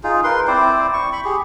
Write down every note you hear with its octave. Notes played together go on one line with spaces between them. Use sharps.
D#4 F4 G#4
A#4 B4 C6
C4 E4 C5 D5
C#6
B5 C#6
G4 G#4